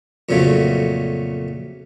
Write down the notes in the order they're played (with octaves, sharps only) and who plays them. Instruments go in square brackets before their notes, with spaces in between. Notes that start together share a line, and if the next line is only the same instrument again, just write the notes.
[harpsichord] F2 A#2 C#3 F#3 A3